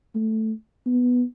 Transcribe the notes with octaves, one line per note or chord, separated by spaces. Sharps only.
A3
B3